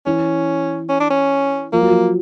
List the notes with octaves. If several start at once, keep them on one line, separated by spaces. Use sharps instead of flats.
E3 C#4
C#4
D4
C#4
F3 A#3
F#3
F3